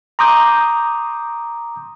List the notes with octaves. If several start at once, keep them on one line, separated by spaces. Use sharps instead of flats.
A#5 C6 D6 D#6 G6